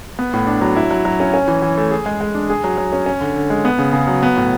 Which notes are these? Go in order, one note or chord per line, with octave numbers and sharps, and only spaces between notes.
B3
A2
D4
F#3
E4
F#3
F#3
C#4
C#4
E3
E3
A3
G#4
G#3
G#3
D4
G#4
F#3
F#3
C#4
C#4
D3
D3
G#3
B3
C#3
C#3
F#3
B3
A2